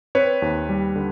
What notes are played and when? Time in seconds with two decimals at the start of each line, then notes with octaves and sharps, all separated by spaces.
0.15 C4 B4 C#5
0.42 D#2
0.69 G3
0.96 D3